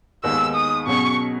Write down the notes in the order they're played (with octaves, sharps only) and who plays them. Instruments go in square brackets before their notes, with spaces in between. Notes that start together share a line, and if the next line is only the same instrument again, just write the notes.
[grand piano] D#2 D#3 G#3 B3 D#4 [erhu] E6
[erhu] D#6
[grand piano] B2 F#3 C#4 G#4 [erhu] C#6